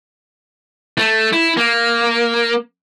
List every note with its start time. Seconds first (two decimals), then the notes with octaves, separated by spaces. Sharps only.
0.98 A3
1.33 E4
1.57 A#3